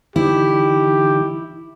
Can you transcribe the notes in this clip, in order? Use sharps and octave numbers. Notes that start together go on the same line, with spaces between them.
D3 E3 D#4 E4 G4